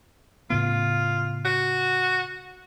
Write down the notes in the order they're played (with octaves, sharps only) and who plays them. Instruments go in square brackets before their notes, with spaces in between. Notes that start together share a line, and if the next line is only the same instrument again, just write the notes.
[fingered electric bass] A2 C#3 B3 [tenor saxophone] F4
[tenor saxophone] F#4